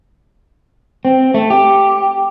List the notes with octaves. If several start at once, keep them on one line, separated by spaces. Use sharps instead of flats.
C4
A3
G4